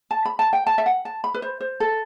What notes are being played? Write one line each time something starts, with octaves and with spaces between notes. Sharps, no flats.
A5
B5
A5
G5
A5
E5
F#5
A5
B5
B4
C5
C5
A4